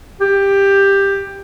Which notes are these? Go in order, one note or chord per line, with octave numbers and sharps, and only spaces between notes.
G4